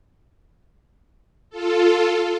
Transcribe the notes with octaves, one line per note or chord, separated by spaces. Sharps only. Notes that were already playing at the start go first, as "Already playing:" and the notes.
F4 A4